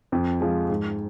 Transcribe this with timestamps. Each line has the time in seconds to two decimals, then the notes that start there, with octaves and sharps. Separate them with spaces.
0.12 F2
0.40 F3 G#3
0.70 G#2